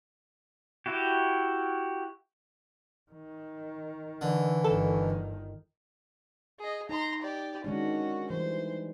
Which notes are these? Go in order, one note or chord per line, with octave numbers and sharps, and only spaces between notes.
E4 F#4 G4
D#3
D3 E3
G1 D#3 A4
G#4 D#5
D#4 A#5 C6
G4 D5
D#3 G#3 C#4 D4 F#4
E3 G3 C5